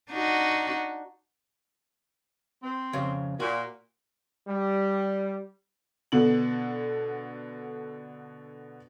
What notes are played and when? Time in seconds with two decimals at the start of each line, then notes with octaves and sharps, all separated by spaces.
0.10 D4 D#4 F#4
2.63 C4
2.93 F2 C#3
3.40 A#2 F#4
4.48 G3
6.12 B2 D3 F#7